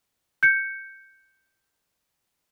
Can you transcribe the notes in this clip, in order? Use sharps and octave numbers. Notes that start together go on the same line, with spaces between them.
G6 C#7